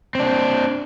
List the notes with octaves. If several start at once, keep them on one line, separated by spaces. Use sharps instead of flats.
C4 D4